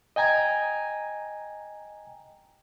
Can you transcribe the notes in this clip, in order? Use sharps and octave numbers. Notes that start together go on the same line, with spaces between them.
D#5 G5 G#5 A#5 G#6